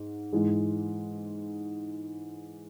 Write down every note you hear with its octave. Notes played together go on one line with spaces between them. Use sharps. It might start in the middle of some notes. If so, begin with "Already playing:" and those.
Already playing: G#2
G#2 E3 G#3